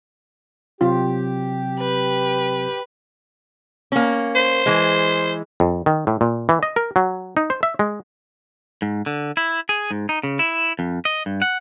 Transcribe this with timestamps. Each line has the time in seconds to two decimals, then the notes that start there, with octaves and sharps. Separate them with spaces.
0.81 C3 F#3 C4 F4 G4
1.79 B4
3.92 A#3 C#4
4.36 C5
4.66 E3 G#3
5.60 F2
5.86 D#3
6.07 A2
6.21 A#2
6.49 E3
6.63 D#5
6.76 A#4
6.96 F#3
7.37 D#4
7.50 C5
7.63 E5
7.79 G#3
8.82 G#2
9.06 D3
9.37 E4
9.69 G#4
9.91 G#2
10.09 D#4
10.23 C#3
10.39 E4
10.79 F2
11.05 D#5
11.26 G2
11.42 F#5